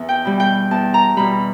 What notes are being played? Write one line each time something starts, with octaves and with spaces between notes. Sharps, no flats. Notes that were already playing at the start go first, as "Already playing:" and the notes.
Already playing: E2
G5
B2 G3
G5
E2 A5
A#5
B2 G3 B5